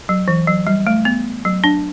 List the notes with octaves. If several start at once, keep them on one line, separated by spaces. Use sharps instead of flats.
F#3
E3
F#3
G3
A3
B3
F#3
D4